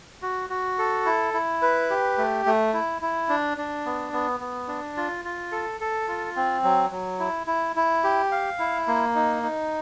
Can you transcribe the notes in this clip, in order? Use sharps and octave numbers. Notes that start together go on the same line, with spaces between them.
F#4
F#4
A4
E4
E4
B4
G4
A3
A3
E4
E4
D4
D4
B3
B3
B3
D4
F4
F4
A4
A4
F4
C4
F#3
F#3
E4
E4
E4
G4
F5
E4
A#3
D#4
D#4